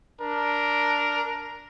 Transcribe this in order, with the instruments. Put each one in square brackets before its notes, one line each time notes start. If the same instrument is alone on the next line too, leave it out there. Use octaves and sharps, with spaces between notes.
[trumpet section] D4 A#4